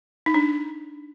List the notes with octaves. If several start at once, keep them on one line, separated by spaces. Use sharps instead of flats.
D#4
D4